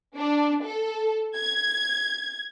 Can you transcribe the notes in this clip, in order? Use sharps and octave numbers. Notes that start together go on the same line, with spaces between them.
D4
A4
G#6